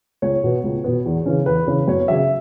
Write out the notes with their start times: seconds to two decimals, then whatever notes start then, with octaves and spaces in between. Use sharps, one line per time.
0.22 C#2 C#5
0.44 B2 B3
0.64 C#2
0.84 B2 B3
1.06 E2
1.26 C#3 E3 C#4
1.46 E2 B4
1.67 C#3 E3 C#4
1.88 F#2 C#5
2.08 C#3 F#3 E5